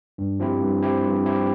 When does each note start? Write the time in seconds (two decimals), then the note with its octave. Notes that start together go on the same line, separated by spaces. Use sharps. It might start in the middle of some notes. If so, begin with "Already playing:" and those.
0.18 G2
0.40 F3 C4 E4 G4
0.62 G2
0.83 F3 C4 E4 G4
1.04 G2
1.25 F3 C4 E4 G4